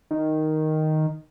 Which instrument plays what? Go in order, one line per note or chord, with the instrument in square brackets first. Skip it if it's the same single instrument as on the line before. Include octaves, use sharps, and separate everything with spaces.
[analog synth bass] D#3